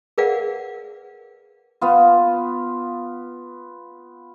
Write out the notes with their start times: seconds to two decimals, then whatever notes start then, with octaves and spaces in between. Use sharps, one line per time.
0.18 G#4 A#4 B4 D5 F5 F#5
1.81 B3 F4